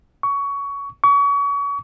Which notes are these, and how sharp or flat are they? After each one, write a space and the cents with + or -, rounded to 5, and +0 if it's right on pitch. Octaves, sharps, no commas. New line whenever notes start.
C#6 +20
C#6 +35